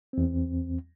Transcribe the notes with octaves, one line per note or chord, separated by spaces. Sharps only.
E2 C4